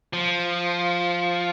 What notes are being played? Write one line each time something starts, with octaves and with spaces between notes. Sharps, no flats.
F3